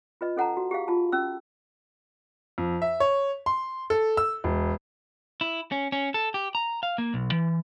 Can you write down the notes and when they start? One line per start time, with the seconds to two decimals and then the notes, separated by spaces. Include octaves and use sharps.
0.21 F4 B4 D#5
0.36 C#4 A4 F#5 A5 A#5
0.57 F#4
0.71 G4 G#4 F5
0.88 F4 A5
1.12 C#4 E6
2.58 F2
2.82 E5
3.00 C#5
3.46 C6
3.90 A4
4.17 E6
4.44 E1
5.41 E4
5.72 C#4
5.92 C#4
6.14 A4
6.34 G4
6.55 A#5
6.83 F5
6.98 A#3
7.14 B1
7.32 E3